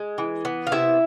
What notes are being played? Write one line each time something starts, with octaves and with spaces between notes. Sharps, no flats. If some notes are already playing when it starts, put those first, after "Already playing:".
Already playing: G#3
E3
B3
F5
C3 E4 E5